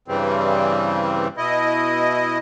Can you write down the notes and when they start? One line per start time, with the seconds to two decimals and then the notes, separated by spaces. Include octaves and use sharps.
0.08 G2 C#3 E3 G3 C4
1.37 B2 E4 D#5